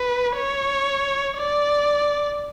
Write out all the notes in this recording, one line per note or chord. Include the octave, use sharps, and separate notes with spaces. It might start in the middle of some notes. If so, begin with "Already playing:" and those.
Already playing: B4
C#5
D5